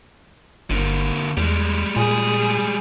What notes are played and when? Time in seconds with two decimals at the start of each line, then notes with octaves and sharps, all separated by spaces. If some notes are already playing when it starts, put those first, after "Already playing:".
0.70 G1 D3 A#3
1.37 E2 G3 G#3
1.96 A#2 G#4